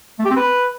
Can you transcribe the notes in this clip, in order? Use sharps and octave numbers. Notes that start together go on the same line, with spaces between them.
A3
G4
C4
B4